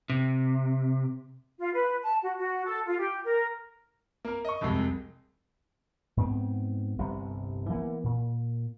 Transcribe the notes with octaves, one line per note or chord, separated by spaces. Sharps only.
C3
F4
B4
A5
F#4
F#4
A4
F4
G4
A#4
A#3 A#4
D#5 C#6
C2 F2 C3 G#3
G#2 B3 C4
G1 C2 C3
E3 A#3 B3
A#2